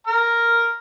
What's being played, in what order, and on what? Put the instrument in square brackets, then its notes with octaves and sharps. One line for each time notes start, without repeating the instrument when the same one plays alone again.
[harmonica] A#5 F6